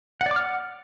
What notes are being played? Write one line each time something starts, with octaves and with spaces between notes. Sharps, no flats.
F#5
D5
D6
F6
F#5